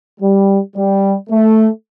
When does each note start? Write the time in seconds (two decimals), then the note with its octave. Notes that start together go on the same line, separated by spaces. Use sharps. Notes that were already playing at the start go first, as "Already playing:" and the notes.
0.21 G3
0.76 G3
1.30 A3